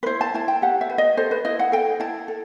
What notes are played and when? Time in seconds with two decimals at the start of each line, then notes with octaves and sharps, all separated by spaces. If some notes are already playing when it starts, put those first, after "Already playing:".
0.03 B4
0.06 E4 C5
0.21 A5
0.34 E4 A5
0.48 G5
0.62 G4 F#5
0.81 E5
0.90 B4
0.98 D#5
1.17 A4 C5
1.31 B4
1.45 E4 D#5
1.59 F#5
1.72 A4 G5
2.00 E4 A5
2.28 A4